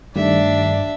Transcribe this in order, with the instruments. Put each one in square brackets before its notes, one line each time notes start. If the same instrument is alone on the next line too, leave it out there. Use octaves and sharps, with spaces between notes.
[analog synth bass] G2 [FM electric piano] D#3 G3 A3 [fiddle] D4 E5 [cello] D5